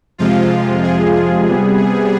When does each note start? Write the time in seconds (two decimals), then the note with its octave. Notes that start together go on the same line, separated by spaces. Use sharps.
0.18 F2 C3 F3 G#3 F4
0.83 G#4
1.14 G#4
1.46 C3 G3 B3 G#4
1.77 G#4